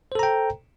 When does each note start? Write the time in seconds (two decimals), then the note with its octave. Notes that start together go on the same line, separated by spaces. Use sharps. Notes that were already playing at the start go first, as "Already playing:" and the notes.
0.12 C5
0.15 A4
0.19 A#5
0.23 G5